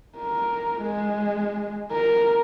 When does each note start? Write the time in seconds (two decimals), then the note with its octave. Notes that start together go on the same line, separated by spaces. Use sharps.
0.18 A#4
0.83 G#3
1.92 A#4